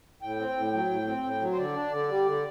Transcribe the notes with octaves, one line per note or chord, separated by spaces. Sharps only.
A2 G5
C4
A2
F#3
A2
C4
A2
F#3
C5
D3 D5
D4
D3
G3
D3